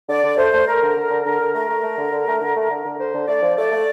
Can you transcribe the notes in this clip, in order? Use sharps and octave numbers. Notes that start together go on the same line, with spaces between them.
D3 D5
D3
A3 C5
A3
A3 A#4
D3
D3
D3
D3 A#4
D3
A3 A#4
A3
A3
D3
D3
A3
D3
A3
D3
D3
D3 C5
D3
A3 D5
F3
A3 D5
A3